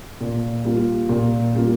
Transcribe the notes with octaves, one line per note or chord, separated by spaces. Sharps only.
A#2
G3 A#3 F4
A#2
G3 A#3 F4